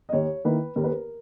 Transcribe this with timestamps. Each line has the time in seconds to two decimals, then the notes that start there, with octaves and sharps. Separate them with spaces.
0.09 D#5
0.13 D#2 C#5
0.45 D#3 A#3 E4 B4
0.76 D#2 A#4
0.84 B4
0.91 A#4